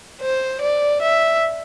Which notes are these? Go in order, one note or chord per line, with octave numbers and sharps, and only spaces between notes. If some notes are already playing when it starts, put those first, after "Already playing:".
C5
D5
E5